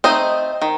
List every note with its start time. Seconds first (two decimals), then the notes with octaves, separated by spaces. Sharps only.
0.04 A3 C4 D#4 C5 D#5
0.62 D#3